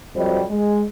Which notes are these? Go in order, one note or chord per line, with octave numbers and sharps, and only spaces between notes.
F2 F#3 G3 C5 D#5
G#3